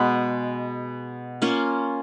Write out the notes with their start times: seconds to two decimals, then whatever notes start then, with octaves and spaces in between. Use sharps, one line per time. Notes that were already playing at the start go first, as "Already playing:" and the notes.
Already playing: B2 G#3 B3
1.42 A#3 C#4 F4